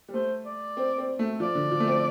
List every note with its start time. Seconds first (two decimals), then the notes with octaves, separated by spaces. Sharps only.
0.08 G3
0.13 A3 C5
0.45 D5
0.77 C4
0.98 C4
1.19 A3
1.40 F3 D5
1.55 D3
1.71 F3
1.80 A3
1.87 C4